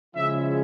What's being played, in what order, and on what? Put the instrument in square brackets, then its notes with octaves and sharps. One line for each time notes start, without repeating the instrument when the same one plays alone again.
[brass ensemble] C#3 F3 G#3 C#4 E4 E5